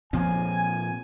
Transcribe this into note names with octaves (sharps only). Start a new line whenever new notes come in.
A#2 F3 C4 G#5